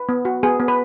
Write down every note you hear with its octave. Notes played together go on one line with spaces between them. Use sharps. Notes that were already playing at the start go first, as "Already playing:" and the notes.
Already playing: B4
B3
F#4
B3 G#4
B3
B4